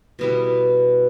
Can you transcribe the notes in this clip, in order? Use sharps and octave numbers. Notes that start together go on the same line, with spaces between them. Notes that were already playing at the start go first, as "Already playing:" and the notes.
B2 G3 B3 E4